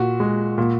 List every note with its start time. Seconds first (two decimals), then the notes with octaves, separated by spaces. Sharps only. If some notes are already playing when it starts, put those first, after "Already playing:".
Already playing: A#2 F#4
0.20 G#3
0.58 A#2